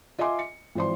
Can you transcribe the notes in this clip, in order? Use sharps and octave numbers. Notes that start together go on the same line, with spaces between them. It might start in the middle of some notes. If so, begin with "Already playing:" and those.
F4 D#5 E5 G#5 C6 D6
C#7
G#1 E3 F3 C5 D5 C6